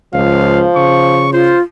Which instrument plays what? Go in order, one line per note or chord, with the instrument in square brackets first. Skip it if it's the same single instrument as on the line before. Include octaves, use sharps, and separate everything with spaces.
[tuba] C#2 [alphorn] F3 [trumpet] F5
[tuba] C#3 [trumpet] C#6
[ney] F4 [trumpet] C5